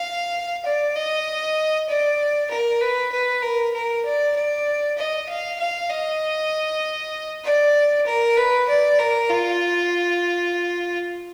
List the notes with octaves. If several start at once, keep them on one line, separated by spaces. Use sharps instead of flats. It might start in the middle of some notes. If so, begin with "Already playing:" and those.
Already playing: F5
D5
D#5
D5
A#4
B4
B4
A#4
A#4
D5
D5
D#5
F5
F5
D#5
D5
A#4
B4
D5
A#4
F4